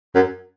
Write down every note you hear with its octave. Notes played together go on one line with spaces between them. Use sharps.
F#2